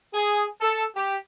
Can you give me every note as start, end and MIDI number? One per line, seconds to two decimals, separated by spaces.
0.13 0.44 68
0.61 0.82 69
0.95 1.15 67